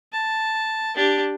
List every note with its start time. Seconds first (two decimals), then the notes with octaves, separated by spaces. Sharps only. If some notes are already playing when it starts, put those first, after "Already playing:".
0.13 A5
0.96 D4 G4